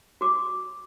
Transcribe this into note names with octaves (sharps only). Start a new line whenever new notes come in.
F#4 D6